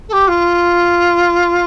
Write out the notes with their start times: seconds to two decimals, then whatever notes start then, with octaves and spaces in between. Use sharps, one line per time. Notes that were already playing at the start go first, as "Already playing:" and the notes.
0.08 A4
0.12 G4
0.27 F4